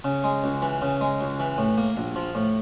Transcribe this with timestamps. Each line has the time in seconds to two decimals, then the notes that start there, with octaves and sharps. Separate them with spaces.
0.04 C#3
0.24 G#3
0.44 C#2
0.62 E3
0.82 C#3
1.01 G#3
1.21 C#2
1.40 E3
1.58 A2
1.78 A#3
1.97 A#1
2.16 F3
2.35 A2